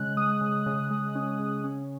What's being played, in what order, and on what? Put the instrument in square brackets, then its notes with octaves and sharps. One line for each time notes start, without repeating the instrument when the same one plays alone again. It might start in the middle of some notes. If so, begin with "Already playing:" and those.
Already playing: [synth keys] C#3 G#3 F#6
G#3 D#6
C#3
C#3
G#3
C#4
C#3
C#4